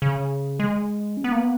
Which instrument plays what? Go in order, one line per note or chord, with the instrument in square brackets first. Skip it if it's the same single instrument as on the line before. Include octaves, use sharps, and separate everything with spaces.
[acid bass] C#3
G#3
C#4
B3
A#3
B3